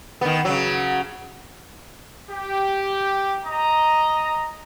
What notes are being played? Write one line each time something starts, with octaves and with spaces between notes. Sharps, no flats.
D#3 B3
C#3 F#3
G4
D#5 A#5